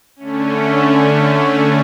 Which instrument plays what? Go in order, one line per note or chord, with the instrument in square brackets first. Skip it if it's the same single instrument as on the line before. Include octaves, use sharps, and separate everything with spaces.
[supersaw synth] D3 A3 C#4